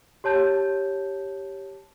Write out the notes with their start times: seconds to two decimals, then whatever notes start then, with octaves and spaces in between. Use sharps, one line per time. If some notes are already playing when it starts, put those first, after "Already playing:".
0.24 G4 C#5 A5 G6